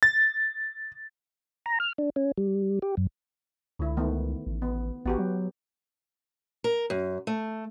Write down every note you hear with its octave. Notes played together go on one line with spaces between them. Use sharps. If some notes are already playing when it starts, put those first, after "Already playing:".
A6
A#5
F6
D4
C#4
G3
G4
F#2
C#2 D3 E4
D#3 A3 B3
A1
B3
A1 B3 F#4 G4
F#3
A#4
F#2
A3